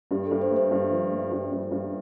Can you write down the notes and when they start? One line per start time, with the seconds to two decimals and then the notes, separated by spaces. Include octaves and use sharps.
0.11 G2 G4
0.27 G2 A4
0.41 C5
0.51 A3
0.56 C5
0.71 G2
0.91 F3
1.11 A3
1.32 G2
1.52 G2
1.71 G2